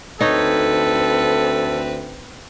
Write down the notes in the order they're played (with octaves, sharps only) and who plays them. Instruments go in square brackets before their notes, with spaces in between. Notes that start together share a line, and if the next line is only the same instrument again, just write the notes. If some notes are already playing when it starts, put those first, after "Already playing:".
[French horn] D2 [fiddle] C4 B4 [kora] D#4 C#5 [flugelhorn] A4